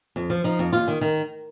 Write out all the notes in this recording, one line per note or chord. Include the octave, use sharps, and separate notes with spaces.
F2
F3
F3 D#4
F2
D#2 F4
D#3
D#3